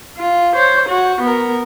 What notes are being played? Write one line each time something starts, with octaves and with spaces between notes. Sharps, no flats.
F4
C5 C#5
F#4
B3 A#4